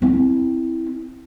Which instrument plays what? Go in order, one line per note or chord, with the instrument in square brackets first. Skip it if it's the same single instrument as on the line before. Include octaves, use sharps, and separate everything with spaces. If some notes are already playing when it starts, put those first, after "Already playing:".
[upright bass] C4 E4